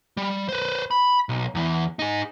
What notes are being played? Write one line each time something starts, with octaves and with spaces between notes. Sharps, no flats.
G3
B4 C5
B5
B1
E2 E3
D#4 G#4